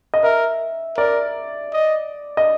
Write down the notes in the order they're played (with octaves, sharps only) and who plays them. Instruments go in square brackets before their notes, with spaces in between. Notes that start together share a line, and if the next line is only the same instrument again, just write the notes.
[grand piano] D#5
[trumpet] A#4 [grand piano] E5
[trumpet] A#4 [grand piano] D5
[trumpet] D#5
[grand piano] D#5